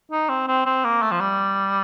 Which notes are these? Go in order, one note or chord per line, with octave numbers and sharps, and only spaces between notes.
D#4
C4
C4
C4
A#3
A3
F3
G3